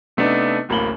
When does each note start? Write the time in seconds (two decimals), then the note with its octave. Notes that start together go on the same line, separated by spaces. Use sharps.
0.17 C3 A3 B3 D4 D#4
0.69 D1 A1 A#3 B5 F#7 G7